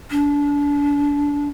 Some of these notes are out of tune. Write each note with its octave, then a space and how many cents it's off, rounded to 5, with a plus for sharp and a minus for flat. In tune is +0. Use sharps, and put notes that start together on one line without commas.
D4 -30